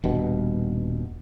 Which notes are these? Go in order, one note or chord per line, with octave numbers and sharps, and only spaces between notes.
D#1 G2 B2